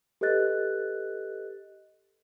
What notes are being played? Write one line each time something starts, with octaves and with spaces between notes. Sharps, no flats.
G4 A4 B4 D#5 F#6 A6